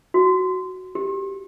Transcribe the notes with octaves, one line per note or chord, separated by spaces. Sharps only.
F#4
G4